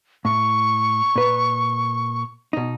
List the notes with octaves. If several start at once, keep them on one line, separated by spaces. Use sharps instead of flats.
A2 C#6
A#2 B4
B2 D#4